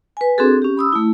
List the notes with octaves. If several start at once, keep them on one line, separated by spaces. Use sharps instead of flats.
B4 G#5
C4 D4 F#4 G#4 A4
C#4 G4
B5 D#6 E6
A3 E4